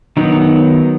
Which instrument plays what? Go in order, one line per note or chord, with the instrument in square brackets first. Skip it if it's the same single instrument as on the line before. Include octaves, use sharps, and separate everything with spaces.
[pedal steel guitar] D#3 F#3 B3 [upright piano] D#4